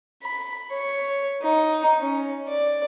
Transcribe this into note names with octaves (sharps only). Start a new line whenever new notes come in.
B5
C#5
D#4
C#4
D5